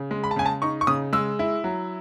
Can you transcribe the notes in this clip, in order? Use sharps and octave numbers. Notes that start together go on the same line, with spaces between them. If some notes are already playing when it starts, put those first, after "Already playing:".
Already playing: C#3
G#3
B5
A5
C#3 G#5
A5
D#4 C#6
C#6
C#3 D#6
G#3 E6
E4
F#3